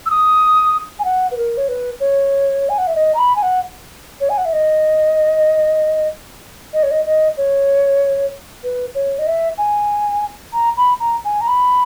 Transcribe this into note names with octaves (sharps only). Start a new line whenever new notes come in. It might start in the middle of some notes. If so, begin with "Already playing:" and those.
E6
D#6
G#5
F#5
B4
A#4
C#5
B4
C#5
G#5
F#5
E5
D#5
A#5
B5
G#5
F#5
C#5
G#5
F#5
E5
D#5
D#5
C#5
D#5
D#5
C#5
B4
C#5
D#5
E5
G#5
A#5
B5
A#5
G#5
A#5
B5